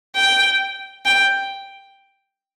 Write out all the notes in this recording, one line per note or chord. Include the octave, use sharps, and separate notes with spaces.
G5
G5